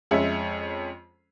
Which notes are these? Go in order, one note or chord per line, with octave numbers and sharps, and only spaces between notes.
F2 G#3 C#4 E5